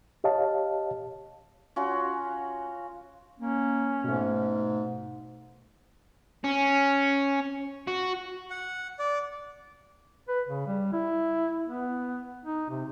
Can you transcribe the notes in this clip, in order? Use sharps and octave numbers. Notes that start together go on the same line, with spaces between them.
G4 C#5 D#5 F5 A5
C#4 F4 F#4
A#3 C#4
G#2 B2 A3
C#4
F#4
F#5
D5
B4
C#3
G3
E4
B3
D#4
C3